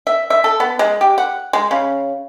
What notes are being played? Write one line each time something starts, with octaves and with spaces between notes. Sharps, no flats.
E5
E5
A4
B3
G#3
G4
F#5
G#3
C#3